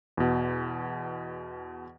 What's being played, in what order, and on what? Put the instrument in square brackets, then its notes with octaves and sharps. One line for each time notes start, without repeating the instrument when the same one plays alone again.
[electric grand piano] E2 B2